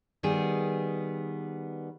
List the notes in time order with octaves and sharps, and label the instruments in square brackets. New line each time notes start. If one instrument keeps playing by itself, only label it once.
[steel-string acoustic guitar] D#3 G3 B3 G#4